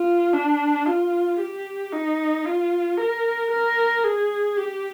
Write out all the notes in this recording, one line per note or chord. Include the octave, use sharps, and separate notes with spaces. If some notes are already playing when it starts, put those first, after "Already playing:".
Already playing: F4
D4
F4
G4
D#4
F4
A#4
A#4
G#4
G4